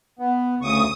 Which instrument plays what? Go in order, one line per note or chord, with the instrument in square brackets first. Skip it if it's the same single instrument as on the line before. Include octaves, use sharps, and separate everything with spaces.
[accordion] B3
[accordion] D2 C#3 C#6 [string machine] D#6